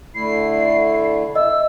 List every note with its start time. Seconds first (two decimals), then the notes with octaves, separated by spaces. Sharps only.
0.15 D3 A3 E4 C7
1.35 D#5 E5 E6